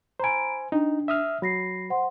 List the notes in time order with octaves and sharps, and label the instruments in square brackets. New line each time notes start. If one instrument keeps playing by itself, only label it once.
[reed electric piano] C5 G#5 [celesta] A#5 B5 D7
[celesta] D4 [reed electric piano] D#4
[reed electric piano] E5 D#6 F6
[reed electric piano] F#3 [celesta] B5 A#6 C7
[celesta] C5 F#5 C6